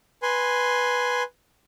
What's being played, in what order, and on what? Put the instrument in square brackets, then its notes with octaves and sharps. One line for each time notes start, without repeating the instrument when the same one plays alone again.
[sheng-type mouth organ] B4 G#5 C6